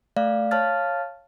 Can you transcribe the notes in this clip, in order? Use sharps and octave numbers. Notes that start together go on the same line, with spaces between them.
A3 D5 F5
C#5 F5 A5 F6 A6